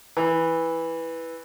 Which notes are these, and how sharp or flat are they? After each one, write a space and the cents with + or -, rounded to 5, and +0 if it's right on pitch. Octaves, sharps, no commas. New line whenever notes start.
E3 -5